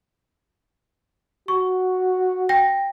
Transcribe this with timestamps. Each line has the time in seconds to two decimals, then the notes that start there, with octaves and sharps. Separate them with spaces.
1.48 F#4 C#6
2.49 G5 A#6